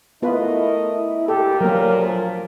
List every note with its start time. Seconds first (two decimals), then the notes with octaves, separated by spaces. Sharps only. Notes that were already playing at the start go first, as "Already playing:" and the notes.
0.22 A3 B3 E4 F4 A#4 B4 D#5
0.92 E4
1.28 D2 A#2 G4 A4
1.61 F#3 A#3 A#4
1.97 F3